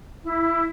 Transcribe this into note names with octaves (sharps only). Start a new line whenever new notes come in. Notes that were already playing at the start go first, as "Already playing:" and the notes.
E4